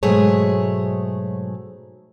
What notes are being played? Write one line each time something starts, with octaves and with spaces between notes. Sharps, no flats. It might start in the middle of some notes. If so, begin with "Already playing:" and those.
G#2 B2 F#3 A3 G#4 C#5